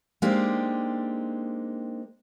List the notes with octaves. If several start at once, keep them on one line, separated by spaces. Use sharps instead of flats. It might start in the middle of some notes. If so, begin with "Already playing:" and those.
G#3 A#3 C4 D4 D#4 G4